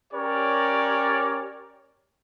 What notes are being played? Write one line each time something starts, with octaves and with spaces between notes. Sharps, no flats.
C#4 G4 A#4 C#5 D5